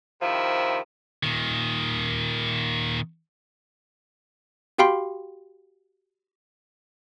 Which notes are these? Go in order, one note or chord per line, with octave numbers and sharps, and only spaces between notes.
C3 D#3 F3 E4
A#2 D#3
F#4 G4 F5 G5 B5 C6